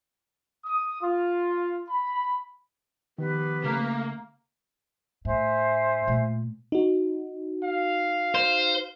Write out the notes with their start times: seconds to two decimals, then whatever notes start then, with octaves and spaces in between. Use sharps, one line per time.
0.64 D#6
1.01 F4
1.88 B5
3.18 D#3 F3 B3 G4 B4
3.64 C#3 A3 A#3
5.25 A2 C5 E5 G#5
6.08 A#2 A3
6.72 D#4 F#4
7.64 F5
8.35 C5